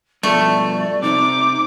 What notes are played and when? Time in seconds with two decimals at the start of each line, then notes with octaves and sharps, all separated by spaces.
0.23 G2 B2 F3 A3 D5
1.03 C3 C4 D#4 D6